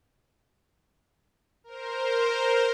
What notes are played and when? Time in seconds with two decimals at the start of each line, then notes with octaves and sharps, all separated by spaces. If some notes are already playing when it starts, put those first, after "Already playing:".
1.64 A#4 C5